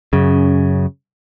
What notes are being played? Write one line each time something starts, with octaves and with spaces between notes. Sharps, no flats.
F#2 C#3